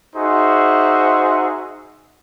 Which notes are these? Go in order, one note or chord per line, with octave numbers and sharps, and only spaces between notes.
D#4 F#4 G#4 C5 E5